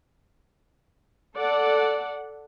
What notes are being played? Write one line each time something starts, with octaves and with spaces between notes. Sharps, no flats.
A4 D5 F#5